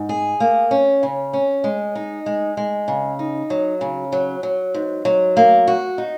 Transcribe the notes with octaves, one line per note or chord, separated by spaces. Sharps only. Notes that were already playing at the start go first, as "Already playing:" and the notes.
Already playing: G#2
G#4
A#3
C#4
C#3
C#4
G#3
D#4
G#3
G#3
C#3
D#4
F#3
C#3
F#3
F#3
G#2
F#3
A#3
F#4
D#4